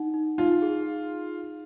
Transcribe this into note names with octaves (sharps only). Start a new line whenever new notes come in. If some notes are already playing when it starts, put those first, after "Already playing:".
Already playing: D#4 F#5
D#4
D#4 F4
G#4